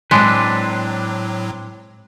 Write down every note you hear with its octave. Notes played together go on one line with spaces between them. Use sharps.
A2 F#3 G#3 C4 D4 B4